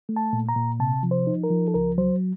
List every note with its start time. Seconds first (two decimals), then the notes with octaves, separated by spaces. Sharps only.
0.09 A3
0.16 A5
0.33 A#2
0.49 A#5
0.56 A#2
0.80 C3 A5
1.03 F3
1.11 C5
1.27 D#4
1.44 A#4
1.50 F3
1.68 A4
1.74 C#2 A#4
1.98 F#3 C5